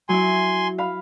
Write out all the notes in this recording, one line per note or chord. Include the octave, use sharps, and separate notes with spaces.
F#3 E4 G#5 C6
F5 B5